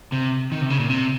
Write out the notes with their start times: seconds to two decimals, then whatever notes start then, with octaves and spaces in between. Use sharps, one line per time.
0.12 C3
0.52 D#3
0.61 C3
0.70 C#3
0.79 A#2
0.90 C3